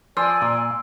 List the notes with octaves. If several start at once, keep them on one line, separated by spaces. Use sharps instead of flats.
F3 D5 G#5 C6 E6
A#2